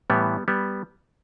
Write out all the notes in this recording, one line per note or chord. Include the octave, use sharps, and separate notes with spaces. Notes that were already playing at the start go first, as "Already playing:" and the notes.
A2 E3 G3 B3
G3 B3